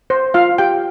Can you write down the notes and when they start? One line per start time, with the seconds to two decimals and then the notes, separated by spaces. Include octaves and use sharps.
0.10 C5
0.34 F4 F5
0.58 G4 G5